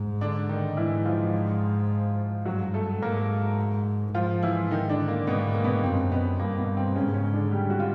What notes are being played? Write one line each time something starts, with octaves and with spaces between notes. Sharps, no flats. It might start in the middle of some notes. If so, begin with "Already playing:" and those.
Already playing: G#2
D3 D4
D#3 D#4
G#2 E3 E4
F3 F4
G2 F#3 F#4
A3 A4
G#2 A#3 A#4
G#2 F3 F4
E3 E4
D#3 D#4
D3 D4
A#3
G#2 B2 B3
A#3
B2 B3
F#2 C3 C4
B2 B3
G2 A#3
B2 B3
C3 C4
G#2 C#3 C#4
C#3 C#4
D3 D4
G3 G4
F#4
F4